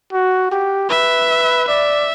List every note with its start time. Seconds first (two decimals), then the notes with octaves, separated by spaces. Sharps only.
0.13 F#4
0.52 G4
0.90 B4 E5
1.68 D5 E5